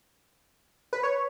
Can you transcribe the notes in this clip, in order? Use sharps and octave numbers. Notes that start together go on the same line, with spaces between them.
B4
C#5